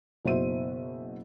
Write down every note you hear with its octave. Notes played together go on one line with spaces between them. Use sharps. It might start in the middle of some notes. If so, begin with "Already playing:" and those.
F#1 B2 F#4 C5 E5 D#7